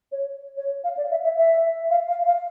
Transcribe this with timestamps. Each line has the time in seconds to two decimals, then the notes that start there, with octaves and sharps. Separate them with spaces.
0.11 C#5
0.56 C#5
0.84 F5
0.97 D5
1.10 E5
1.23 E5
1.37 E5
1.90 F5
2.08 F5
2.26 F5